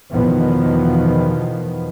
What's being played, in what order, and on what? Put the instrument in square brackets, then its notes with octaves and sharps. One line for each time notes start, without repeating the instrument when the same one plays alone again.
[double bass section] E2 B2 D#3 F3 B3